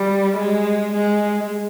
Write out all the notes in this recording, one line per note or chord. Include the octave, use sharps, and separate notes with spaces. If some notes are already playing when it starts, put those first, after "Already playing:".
Already playing: G3
G#3
G#3